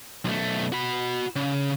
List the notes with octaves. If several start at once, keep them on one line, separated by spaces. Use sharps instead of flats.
B1 A3
F#4 B5
C#3